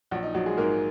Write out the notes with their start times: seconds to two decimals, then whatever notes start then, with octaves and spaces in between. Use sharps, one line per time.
0.11 A#1 F#3 F#4
0.23 D#4
0.34 A#1 F#3 F#4
0.46 G#3 G#4
0.57 G#2 A#3 A#4